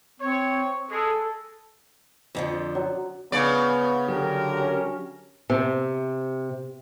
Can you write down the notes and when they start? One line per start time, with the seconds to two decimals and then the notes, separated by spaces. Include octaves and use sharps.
0.20 C4 C#5
0.91 G#3 G#4 A4
2.35 F2 D3 F3
2.75 F#3
3.32 C#3 B3 D5
4.08 D3 F#3 G4 A#4
4.60 C#4
5.50 C3